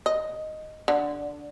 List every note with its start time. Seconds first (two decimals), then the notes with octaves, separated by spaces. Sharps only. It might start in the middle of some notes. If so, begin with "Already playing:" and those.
0.06 D#5
0.88 D3